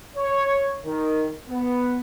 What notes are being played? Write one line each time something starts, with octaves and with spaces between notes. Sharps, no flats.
C#5
D#3
B3